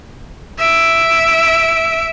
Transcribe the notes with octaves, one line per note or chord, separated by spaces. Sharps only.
E5 D7